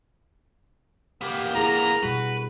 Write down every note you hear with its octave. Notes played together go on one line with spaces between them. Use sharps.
A#3 B3 G4
E4 G#4 A#5
B2 G3 F#4 B4